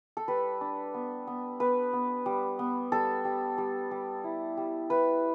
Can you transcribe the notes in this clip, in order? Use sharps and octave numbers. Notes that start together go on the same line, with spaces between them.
A4
G3 B4
D4
B3
B3
B3 B4
B3
G3
B3
G3 A4
G3
G3
G3
E4
G3
E4 B4